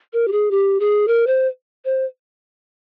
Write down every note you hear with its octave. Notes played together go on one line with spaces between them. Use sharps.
A#4
G4
G#4
G4
G#4
A#4
C5
C5